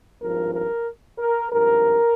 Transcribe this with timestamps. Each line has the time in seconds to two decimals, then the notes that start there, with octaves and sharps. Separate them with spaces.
0.20 G#1 G2 F3 A#4
0.53 A#4
1.18 A#4
1.51 G#1 G2 F3 A#4